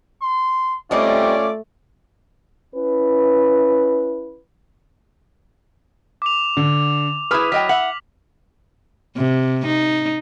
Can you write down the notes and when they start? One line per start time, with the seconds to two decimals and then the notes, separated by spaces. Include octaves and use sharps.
0.22 C6
0.91 G3 A3 C4 C#4 F4 D5 D#5 D6
2.76 C#4 E4 B4
6.22 D6 F7
6.57 D3
7.31 E4 G#4 B4 B5 D#6 F6
7.52 F#3 D#5 G5 B6
7.69 E5 F#5 F#7
9.17 C3
9.66 D#4